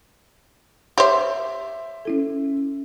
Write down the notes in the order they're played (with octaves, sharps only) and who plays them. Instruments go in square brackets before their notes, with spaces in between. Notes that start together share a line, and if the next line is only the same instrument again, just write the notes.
[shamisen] G4 C5 [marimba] C#5 [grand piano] E5
[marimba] C#4 E4 A4